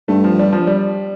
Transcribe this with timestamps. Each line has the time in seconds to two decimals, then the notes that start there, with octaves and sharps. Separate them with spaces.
0.08 G2 A3
0.24 F3
0.39 G3
0.53 F3
0.67 G3